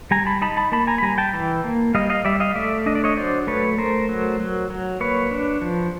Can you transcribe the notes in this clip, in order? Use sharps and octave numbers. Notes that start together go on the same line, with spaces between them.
G3 G#5 A#5
A5 B5
D#4 A5 B5
A5 B5
A#3 A5 B5
G#5 A#5
B5
G3 G#5 A#5
G5 A5
E3
A#3
G3 D#5 F5
D#5 F5
G3 D5 E5
D#5 F5
A3 D5 E5
D4 D#5
D5
C#5 D#5
F#3 C5 D5
A3 B4 C#5
A3 A#4 C5
F#3
F#3
F#3
A#3 B4 C#5
D4
F3